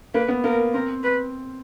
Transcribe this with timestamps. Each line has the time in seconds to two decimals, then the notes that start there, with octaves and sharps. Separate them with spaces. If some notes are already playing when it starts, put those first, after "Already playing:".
0.14 A#3 B4
0.28 B3
0.44 A#3 A#4
0.74 C4 A#4
1.03 B4